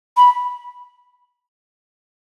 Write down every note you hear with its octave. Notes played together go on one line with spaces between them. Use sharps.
B5